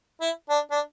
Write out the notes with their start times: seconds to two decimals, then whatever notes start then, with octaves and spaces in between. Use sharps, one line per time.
0.21 E4
0.49 D4
0.71 D4